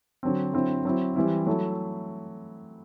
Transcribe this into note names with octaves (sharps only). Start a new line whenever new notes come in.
D3 F#3 C4
D3 F#3 C4 E4
F#3 C4 E4
E3 G3 C4 E4
F#3 A3 E4